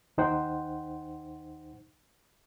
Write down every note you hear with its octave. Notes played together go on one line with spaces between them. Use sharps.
D#2 D#4 C5 F#5 G5